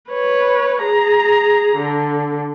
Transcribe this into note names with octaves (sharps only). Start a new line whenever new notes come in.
B4 C#5
G#4 A#5
D3